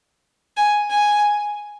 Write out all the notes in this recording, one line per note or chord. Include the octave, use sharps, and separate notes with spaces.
G#5
G#5